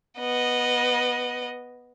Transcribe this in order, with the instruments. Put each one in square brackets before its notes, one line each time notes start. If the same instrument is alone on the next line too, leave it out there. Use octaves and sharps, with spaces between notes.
[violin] B3 D#5